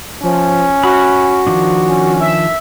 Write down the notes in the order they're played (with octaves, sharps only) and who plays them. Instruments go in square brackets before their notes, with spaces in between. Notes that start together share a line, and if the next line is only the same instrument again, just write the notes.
[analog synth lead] F3 [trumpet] C#4
[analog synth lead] F#4 [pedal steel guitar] B5 F6
[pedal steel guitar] D#3 F3 D4
[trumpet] C#4
[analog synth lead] E5